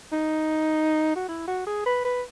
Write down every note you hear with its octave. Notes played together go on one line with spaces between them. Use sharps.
D#4
F#4
E4
F#4
G#4
B4
B4